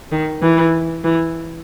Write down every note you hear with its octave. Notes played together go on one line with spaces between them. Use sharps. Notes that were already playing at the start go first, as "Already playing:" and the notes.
D#3
E3
E3